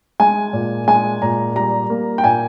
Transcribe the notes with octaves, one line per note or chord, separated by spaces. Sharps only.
G#3 G#5
A#2
G#3 G#5
A#2 A#5
G3 A#5
A#3
G5
A#2 G#5